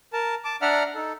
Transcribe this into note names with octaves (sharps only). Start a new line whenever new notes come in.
A#4 A5
A5 D6
D4 D5 E5 F#5 A#5 F6
D#4 A4